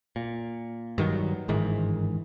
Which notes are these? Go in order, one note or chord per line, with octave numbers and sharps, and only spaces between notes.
A#2
G2 D#3 F#3
G1 G#2 D#3 E3